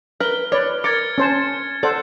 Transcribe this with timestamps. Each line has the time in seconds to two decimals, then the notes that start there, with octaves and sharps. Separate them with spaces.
0.20 A#4 B4 F6 G7
0.52 B4 C#5 D5
0.84 A#4 D6 G#6 A6 C#7
1.18 C#4 C5 A5
1.83 A4 C5 D5 F#5